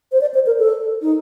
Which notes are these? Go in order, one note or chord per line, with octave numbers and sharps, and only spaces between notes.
C5
D5
C5
A#4
A4
D#4